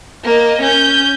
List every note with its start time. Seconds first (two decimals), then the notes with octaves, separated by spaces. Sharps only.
0.24 A#3 D#5
0.62 C#4 G6